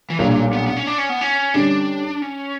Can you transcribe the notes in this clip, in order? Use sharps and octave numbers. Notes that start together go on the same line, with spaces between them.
E3
B1 A#2 F#3 G3 A#3 D4
F#3
B3
B3
C#4
D4
C#4
B3
C#4
D3 G3 C#4 D4
C#4